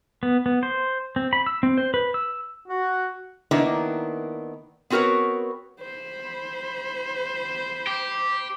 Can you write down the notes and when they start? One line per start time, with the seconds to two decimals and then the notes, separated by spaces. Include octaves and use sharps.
0.23 B3
0.46 B3
0.63 C5
1.16 C4
1.33 B5
1.46 E6
1.63 C4
1.78 C5
1.94 B4
2.14 E6
2.68 F#4
3.51 D#3 A#3 B3 D4 E4
4.90 B3 C4 F#4 A#4 B4 C#5
5.80 C5 B5
7.87 G4